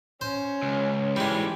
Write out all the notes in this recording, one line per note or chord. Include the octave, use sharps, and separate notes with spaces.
C#4 C5
C#2
G#2 E3 G3 G#3 G5